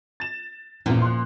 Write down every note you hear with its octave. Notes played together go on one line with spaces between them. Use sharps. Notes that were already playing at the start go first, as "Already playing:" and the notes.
A6 E7
A1 E2 A#2 F3
C6 F#6